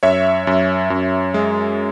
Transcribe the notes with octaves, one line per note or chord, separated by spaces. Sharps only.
F#2 C#5 E5
F#2
F#2
G#3